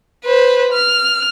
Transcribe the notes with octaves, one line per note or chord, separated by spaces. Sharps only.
B4 C5
F6